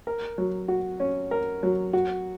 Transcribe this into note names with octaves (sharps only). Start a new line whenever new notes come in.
A#4
F#3
F#4
C#4
A#4
F#3
F#4